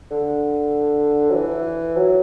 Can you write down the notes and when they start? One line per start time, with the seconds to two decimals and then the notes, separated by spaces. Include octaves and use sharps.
0.11 D3
1.30 F#3
1.34 E3
1.96 F#3